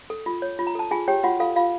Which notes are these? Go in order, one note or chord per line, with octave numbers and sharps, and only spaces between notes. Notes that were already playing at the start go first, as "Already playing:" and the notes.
A4
F4
C#5
F4
A#5
A4 A5
F4 G#4 G#5
G4 C#5 G5
F4 F#4 F#5
F4 A4 F5
F4 F5